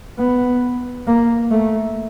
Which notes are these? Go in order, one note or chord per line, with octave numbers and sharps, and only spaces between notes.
B3
A#3
A3